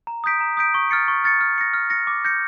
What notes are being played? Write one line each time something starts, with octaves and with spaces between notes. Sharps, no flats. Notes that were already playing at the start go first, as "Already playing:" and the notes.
A#5
D#6 G6 B6 D7
A#5
D#6 G6 B6 D7
C#6
F6 A6 C#7
C#6
F6 A6 C#7
F6
A#6 C#7
F6
A#6 C#7
D6
G6 A#6 C#7